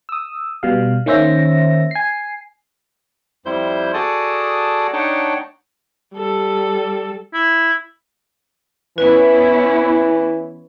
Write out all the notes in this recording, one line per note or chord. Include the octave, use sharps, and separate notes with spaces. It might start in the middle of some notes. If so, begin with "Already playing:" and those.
D#6 E6
B2 G3 F5
D#3 A#3 C#4 C5 E5 A#6
G#5 C7
F2 G3 E4 C5 G6
F#4 G#4 A4 D5 A5 D#6
D4 D#4 C#5 F#5 G5 A5
G3 A4
E4
E3 B3 C#4 E4 B4